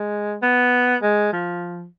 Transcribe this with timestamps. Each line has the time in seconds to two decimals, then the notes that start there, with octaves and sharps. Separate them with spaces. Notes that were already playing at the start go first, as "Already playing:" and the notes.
Already playing: G#3
0.43 B3
1.02 G#3
1.33 F3